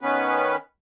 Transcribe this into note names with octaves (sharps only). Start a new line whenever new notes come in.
D#3 B3 C#4 B4